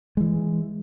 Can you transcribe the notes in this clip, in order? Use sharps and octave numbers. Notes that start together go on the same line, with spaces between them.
E3 G#3